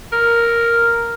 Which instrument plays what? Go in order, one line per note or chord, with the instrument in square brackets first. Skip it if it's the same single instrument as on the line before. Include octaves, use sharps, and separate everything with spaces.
[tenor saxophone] A#4